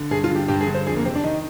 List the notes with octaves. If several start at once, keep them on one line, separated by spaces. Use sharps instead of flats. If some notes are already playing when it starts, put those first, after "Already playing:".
Already playing: D3
G2 G#4
F4
D3
G4
G2 G4
G#4
D3
C5
F2 G#4
A#3
C3 C4
D4
D#3 D#4